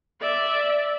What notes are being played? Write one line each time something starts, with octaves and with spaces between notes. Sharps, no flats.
D5 E5